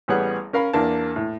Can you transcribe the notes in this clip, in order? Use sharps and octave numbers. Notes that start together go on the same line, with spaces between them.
A1 G3 B3 G#4 C#5 F#5
C#4 A#4 F5 B5
E2 A#3 D4 A5
A2